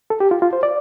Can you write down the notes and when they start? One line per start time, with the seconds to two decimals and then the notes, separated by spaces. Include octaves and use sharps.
0.10 A4
0.20 G4
0.31 F4
0.42 F4
0.53 C5
0.63 D5